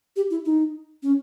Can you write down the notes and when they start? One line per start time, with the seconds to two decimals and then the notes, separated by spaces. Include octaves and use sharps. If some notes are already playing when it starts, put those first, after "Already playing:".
0.16 G4
0.31 E4
0.45 D#4
1.03 C#4